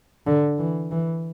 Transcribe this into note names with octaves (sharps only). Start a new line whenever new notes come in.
D3
E3
E3